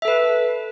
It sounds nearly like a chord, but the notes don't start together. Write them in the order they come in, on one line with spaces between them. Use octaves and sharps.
E5 A4 B4